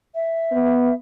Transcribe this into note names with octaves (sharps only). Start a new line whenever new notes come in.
E5
B3